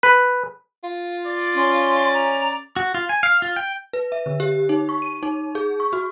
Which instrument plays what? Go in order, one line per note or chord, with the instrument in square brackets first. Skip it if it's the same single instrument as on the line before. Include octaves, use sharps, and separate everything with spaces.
[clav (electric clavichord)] B4
[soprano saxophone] F4
[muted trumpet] D5
[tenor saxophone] C#4 [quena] C6
[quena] A#5
[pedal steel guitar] F#4
F4
G#5
F5
F4
G5
[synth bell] B4
E5
D3
G4
D#4
C#6
D#7
D#4
G#4
C#6
F#4